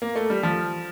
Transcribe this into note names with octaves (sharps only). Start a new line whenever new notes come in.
A#3
A3
G3
F3